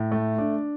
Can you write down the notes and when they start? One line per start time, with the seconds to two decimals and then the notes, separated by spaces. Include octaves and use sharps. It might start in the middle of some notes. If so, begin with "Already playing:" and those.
Already playing: A2
0.12 A3
0.38 D4